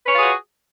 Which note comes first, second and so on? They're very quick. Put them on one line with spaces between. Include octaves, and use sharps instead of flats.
B4 C#5 F4 G#4 F#4